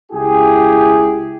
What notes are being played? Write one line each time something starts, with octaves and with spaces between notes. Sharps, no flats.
C#2 E4 G4 G#4